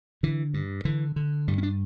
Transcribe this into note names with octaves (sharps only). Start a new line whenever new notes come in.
D3 E3
G2
D3 E3
D3
G2 G3
C#4
D4